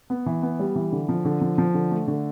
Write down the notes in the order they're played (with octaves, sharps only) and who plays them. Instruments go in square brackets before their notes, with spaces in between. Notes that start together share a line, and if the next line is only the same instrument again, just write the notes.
[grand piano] B3
E3
B3
G3
E3
D3
F3
D3
F3
F3
D3
A3
D3